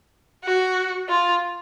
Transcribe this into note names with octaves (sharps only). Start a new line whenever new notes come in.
F#4
F4